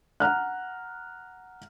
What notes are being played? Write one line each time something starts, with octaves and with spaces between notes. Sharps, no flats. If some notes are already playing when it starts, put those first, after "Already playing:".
F#5 A#5 F6 F#6